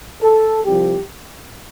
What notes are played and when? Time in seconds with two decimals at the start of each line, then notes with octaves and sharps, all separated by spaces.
0.22 A4
0.65 C2 C3 F3 G4